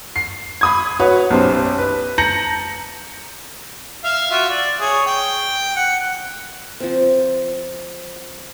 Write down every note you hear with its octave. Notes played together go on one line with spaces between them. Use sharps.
C7
B5 D#6 G#6
F#4 B4 C#5
B1 F#2 G4 C5
B4
A5 A#5 G6 A#6 C#7 F#7
E5 F5
F4 F#4 E5
D5
G#4 C#5
G5
F#5
F3 C4